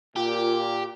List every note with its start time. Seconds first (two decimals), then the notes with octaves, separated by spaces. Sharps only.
0.16 A#2 F4 G4